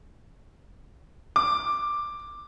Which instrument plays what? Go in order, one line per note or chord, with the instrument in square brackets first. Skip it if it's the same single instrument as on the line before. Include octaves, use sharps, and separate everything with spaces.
[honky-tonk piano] D6